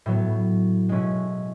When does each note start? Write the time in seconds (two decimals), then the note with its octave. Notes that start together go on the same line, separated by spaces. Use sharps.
0.06 A2 F#3 B3
0.89 B2 G#3 C#4 E4